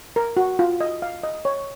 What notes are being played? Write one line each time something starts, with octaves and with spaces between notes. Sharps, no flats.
A#4
F#4
F4
D#5
F5
D#5
C#5